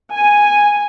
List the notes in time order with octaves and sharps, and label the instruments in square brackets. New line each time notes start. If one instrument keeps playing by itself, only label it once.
[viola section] G#5